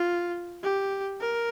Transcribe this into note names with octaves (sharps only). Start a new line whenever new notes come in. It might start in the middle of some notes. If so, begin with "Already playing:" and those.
Already playing: F4
G4
A#4